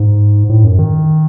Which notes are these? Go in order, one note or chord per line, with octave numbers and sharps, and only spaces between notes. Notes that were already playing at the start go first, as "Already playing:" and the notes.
Already playing: G#2
A2
F#2
D#3